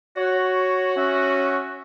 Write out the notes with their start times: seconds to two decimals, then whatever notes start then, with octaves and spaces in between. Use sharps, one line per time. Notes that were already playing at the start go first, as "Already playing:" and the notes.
0.17 F#4 C#5
0.97 C#4 E5